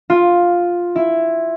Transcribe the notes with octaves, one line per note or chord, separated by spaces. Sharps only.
F4
E4